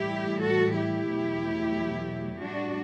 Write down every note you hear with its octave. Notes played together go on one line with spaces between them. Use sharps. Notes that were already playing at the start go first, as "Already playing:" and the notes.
Already playing: A2 E3 G3 E4 G4
F#4 A4
E4 G4
E2 B2 F#3 A3
A2 G3 D4 F#4